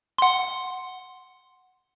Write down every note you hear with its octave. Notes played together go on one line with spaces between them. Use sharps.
F#5 C6